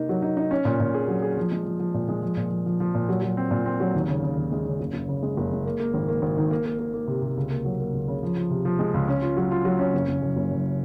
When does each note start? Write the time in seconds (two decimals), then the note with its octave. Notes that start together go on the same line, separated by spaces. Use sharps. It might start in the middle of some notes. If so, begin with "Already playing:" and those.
Already playing: C3 A#3 D#4
0.09 F#3
0.22 D#4
0.37 D#4
0.51 C#4
0.65 A#2
0.80 A#2
0.94 G#4
1.08 F#3
1.22 G#4
1.37 F3
1.52 G#3
1.65 F3
1.80 F3
1.94 A#2
2.08 G#3
2.22 F3
2.37 A#2
2.51 F3
2.66 F3
2.80 F3
2.95 A#2
3.09 F#3
3.22 F#3
3.37 C4
3.51 A#2
3.66 C4
3.80 F#3
3.94 D#2
4.08 C#3
4.23 C#3
4.37 D#2
4.52 G#3
4.66 C#3
4.80 F#1
4.93 F#1
5.08 C#3
5.23 G#3
5.37 F#1
5.52 G#3
5.66 A#3
5.80 A#3
5.94 G#1
6.08 A#3
6.22 G#1
6.37 D#3
6.51 A#3
6.65 A#3
6.79 A#3
6.94 A#3
7.08 C3
7.22 C3
7.37 C#2
7.50 A#3
7.65 F#3
7.80 A#3
7.94 C#2
8.08 C#3
8.23 F3
8.37 F3
8.50 C3
8.65 F3
8.79 G#3
8.94 C#2
9.08 C#4
9.22 F4
9.37 F#3
9.51 F4
9.65 F#3
9.79 C#4
9.94 F#1
10.09 F#1
10.22 F#2
10.37 F#1
10.51 F#2